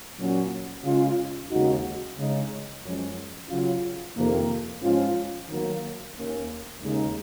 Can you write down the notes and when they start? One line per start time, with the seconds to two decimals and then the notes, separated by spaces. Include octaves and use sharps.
0.17 A#2 F#3 C#4 F#4
0.84 C#3 G#3 C#4 F4
1.50 D#2 C#3 G#3 D#4 F#4
2.17 C#3 G#3 D#4
2.83 F#2 F3 G#3 C#4
3.50 C#3 F#3 C#4 F4
4.17 F2 C3 D#3 A#3
4.82 G#2 F3 G#3 C#4 F4
5.49 D#3 F#3 A#3
6.16 D#2 D#3 A#3 C#4
6.81 D#2 C#3 G#3 D#4